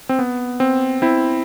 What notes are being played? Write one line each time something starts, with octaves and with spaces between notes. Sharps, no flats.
C4
B3
C4
C4 E4